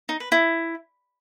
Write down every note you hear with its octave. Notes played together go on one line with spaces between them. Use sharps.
D#4
B4
E4